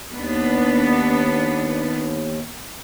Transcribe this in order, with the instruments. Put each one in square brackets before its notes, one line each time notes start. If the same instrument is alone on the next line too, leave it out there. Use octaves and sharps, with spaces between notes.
[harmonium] D#2 [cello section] B3 D4